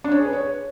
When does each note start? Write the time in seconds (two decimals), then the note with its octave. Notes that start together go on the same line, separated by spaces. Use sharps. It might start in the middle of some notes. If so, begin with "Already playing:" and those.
0.04 D4
0.12 C#5
0.19 G#4
0.26 B4
0.33 C#5